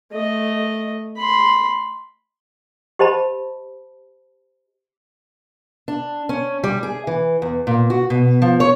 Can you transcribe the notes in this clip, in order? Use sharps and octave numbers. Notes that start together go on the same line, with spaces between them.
A3 D#5
B5 C6
G4 C5 D#5 A5 B5
D4
C#4
G3
G#4
E3
E2
A#2
F#4
B2
F3
C#5